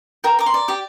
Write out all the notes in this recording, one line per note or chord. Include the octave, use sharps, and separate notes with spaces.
A#4 G5
A#4 D6
C6
D5
G4 D6